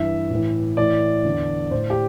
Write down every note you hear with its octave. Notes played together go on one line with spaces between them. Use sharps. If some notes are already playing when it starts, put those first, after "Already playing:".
Already playing: G2 E3 E5
A2
E3
A2 E3 D5
E2 D3
A2 E3 C5
G4